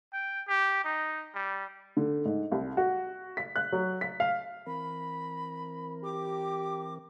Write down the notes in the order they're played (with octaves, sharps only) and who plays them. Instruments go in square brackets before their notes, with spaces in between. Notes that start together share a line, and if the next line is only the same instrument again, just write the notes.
[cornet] G5
G4
D#4
G3
[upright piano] D3
G#2
C2
F#4
B6
F#6
F#3
B6
F5
[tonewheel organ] E3 C4 A#4 [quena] B5
[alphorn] G4 [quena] D6